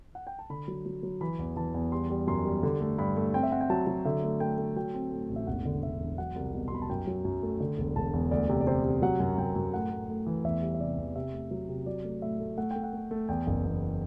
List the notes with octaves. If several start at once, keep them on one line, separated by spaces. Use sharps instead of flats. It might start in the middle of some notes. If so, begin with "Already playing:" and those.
F#5
G5
A5
D3 B5
F#3
F#3
F#3
E3 B5
E2
E3 A5
E2
G3 C6
G3
F#2 C6
G3
D3
A3
G2 B5
A3
C4 G5
E5
C4 F#5
G5
F#3 A5
F#3
D3 E5
A3
A3 G5
A3
F#3 G5
C4
A2
A1
E5
E1 F#5
D3
D3 E5
E2
F#3 F#5
C2
B2
C6
B2 B5
A5
F#2 G5
F#3
F#2
A3
D3
E1
E1 A5
E2
D2 D5
C3
D5
C3 C5
C3
F#3 F#5
F#2
F#2 G5
F#2
A2 F#5
A2
A2
E3
E2 E5
G3
E5
C3 D5
E2
C3 E5
A3
F#3
C3
F#3 D5
A3
A2 E5
A3
A3 F#5
A3 G5
F#5
A3
A3
E2 G5
F#1
E2